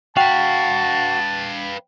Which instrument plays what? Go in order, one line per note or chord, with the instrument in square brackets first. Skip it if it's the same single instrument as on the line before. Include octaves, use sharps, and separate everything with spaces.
[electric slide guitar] F#4 [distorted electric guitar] B4 F5 [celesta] G5 [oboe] A5